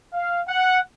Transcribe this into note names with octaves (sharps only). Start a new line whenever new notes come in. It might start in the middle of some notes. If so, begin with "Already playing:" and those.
F5
F#5